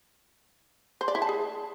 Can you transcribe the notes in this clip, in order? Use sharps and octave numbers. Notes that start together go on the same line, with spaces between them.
C5
D5
E4
A5
G#4